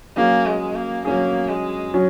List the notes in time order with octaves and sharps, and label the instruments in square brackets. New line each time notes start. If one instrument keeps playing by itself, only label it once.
[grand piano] F#3 C#4 G#4 [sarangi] A#3
[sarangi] G#3
A#3
[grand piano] F#3 C#4 G#4 [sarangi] A#3
[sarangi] G#3
[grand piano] F#3 C#4